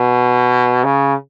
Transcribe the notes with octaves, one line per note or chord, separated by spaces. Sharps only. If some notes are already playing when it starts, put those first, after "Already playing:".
Already playing: B2
C#3